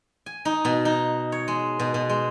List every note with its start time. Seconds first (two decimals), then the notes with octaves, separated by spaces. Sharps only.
0.26 G#5
0.45 D#4
0.65 B2
0.85 D#4
1.32 C#5
1.48 G#3
1.79 B2
1.94 B2
2.09 G#3